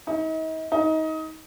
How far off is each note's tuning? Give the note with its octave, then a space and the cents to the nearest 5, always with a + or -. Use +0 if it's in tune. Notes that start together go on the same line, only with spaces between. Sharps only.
D#4 +40
D#4 +25